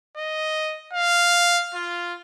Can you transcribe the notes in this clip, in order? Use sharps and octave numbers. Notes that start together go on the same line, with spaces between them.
D#5
F5
F4